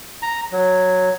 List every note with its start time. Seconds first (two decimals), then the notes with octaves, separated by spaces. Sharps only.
0.22 A#5
0.52 F#3